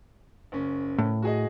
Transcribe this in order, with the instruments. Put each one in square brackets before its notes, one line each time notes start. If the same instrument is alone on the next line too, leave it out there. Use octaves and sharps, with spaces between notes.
[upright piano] F#1 C#4
[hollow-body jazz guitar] A2
[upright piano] F#4 G#4 D#5